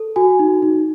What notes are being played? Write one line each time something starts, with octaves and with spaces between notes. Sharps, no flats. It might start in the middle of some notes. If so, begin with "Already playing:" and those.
Already playing: A4
F#4 G#5
D#4
D#4